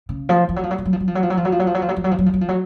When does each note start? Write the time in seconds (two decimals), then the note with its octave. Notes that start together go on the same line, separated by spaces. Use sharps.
0.09 C#3
0.29 F3
0.49 F3
0.56 F#3
0.63 F3
0.71 F#3
0.78 F3
0.85 F#3
0.93 F3
1.00 F#3
1.08 F3
1.15 F#3
1.23 F3
1.30 F#3
1.37 F3
1.45 F#3
1.52 F3
1.59 F#3
1.67 F3
1.74 F#3
1.82 F3
1.89 F#3
1.96 F3
2.04 F#3
2.11 F3
2.19 F#3
2.26 F3
2.33 F#3
2.41 F3
2.48 F#3